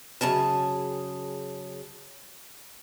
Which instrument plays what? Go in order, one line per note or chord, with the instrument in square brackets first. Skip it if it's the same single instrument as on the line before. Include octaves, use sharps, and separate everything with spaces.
[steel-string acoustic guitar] F#2 C#3 G#4 A5